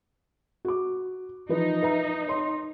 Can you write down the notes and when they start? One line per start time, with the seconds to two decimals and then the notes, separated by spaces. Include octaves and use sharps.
0.65 F#4 D6
1.49 E3 F3 D#4 B4
1.82 B4 E5 A#5
2.27 C#5 C6